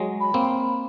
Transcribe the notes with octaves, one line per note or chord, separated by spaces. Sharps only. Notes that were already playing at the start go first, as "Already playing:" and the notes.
Already playing: F#3 G#3
B5
A#3 C4